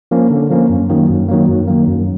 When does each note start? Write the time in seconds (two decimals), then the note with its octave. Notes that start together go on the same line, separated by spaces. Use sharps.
0.11 F3 A#3 C#4
0.30 D3
0.50 F3 A#3 C#4
0.70 F#2
0.90 D#3 F#3 A#3
1.09 F#2
1.28 D#3 F#3 A#3
1.48 F#2
1.68 D#3 F#3 A#3
1.87 F#2